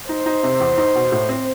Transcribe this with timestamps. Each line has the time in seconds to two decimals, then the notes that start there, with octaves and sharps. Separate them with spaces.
0.09 D#4 C5
0.26 D#4
0.43 C3
0.60 E2
0.78 D#4
0.95 B2
1.12 A2
1.29 C4